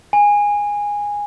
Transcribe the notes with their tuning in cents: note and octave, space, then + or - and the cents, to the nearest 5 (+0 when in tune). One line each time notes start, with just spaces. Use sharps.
G#5 -15